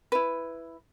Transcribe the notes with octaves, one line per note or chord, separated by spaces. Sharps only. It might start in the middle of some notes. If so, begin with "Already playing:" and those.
E4 B4